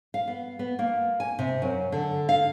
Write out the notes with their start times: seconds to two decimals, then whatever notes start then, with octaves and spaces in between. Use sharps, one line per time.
0.14 F5
0.27 B3
0.59 B3
0.79 A#3
1.20 G#5
1.39 C3
1.62 F#2
1.92 D3
2.29 F5